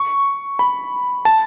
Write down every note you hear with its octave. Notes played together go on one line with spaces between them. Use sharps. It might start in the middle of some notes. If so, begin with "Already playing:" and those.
Already playing: C#6
B5
A5